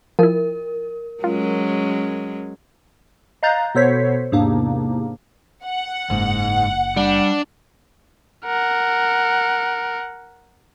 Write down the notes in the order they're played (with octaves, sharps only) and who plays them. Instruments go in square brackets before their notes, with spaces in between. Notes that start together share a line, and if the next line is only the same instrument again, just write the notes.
[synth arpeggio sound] F3 E4 [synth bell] A#4
[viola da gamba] F#3 G#3 C#4 [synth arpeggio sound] F4
[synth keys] D#5 F5 A#5 F#6 G6 A6
B2 B3 A4 C5 C#5 B6
E2 G#2 C3 A#3 D4
[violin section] F#5
[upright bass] F#1 [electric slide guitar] G#2
[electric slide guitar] G3 [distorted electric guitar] D4
[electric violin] A#4 F#5